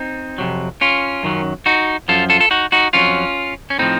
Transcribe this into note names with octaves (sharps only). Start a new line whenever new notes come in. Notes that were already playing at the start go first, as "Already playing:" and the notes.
Already playing: C4 D#4
F2 C3 F#3
C#4 F4
F#2 D#3 F#3
D#4 F#4
F#2 F3 F4 A4
F4 A4
A4
D#4 F#4
D#4 F#4
F2 D#3 C#4 F4
F#3
C#4
A2 F3 C4 D#4